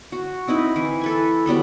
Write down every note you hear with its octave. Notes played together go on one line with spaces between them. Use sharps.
F#4
C4 D#4 E4 B4
E3
A4 B4 G#5
F#3 G3 B3 A4